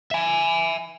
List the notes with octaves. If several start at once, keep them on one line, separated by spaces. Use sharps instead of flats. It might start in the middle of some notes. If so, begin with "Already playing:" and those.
E5 G#5